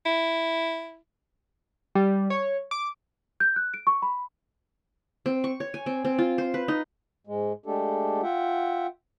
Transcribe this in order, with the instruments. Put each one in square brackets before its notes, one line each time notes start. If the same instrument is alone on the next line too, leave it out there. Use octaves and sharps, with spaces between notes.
[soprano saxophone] E4
[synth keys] G3
C#5
D6
[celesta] G6
F#6
D7
C#6
B5
[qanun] C4
C#6
C#5
G#5
C4
C4
F4
C5
B4
D#4
[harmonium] G#2 G#3
G#3 A3 D4 G4 A4
F4 E5 F#5 G5